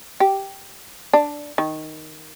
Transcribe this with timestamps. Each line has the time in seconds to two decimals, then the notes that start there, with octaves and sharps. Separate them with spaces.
0.20 G4
1.13 D4
1.58 D#3